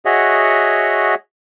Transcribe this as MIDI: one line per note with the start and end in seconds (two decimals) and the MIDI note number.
0.05 1.15 66
0.05 1.15 68
0.05 1.15 73
0.05 1.15 75
0.05 1.15 76
0.05 1.15 78